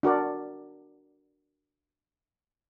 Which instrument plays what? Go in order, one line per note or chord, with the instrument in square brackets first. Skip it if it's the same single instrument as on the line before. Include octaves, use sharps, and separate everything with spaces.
[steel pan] D4 F#4 A#4 D5